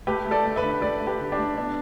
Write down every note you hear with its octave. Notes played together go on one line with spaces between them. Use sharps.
A3 G4 B4
A3
A4 D5
A3
B4 E5
D3
A3 A4 D5
A3
G4 B4
D3
D4 G4
A3
B3 D4